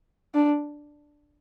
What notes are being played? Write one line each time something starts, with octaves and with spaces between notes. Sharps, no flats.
D4